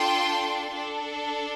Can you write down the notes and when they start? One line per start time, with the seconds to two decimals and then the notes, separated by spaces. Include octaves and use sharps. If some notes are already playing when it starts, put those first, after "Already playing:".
Already playing: D4 F4 A4 G5 C6
0.72 D4 A4